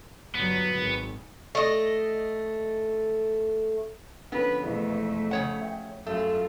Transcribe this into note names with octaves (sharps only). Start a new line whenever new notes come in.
G1 F#3 B3
G#1
A3 D#5
D3 F3 B3 C#4 B4
E1 F2 G#3 A3 E4
C#3 C#5 F#5
E5 G5
F#2 G3 A3 F4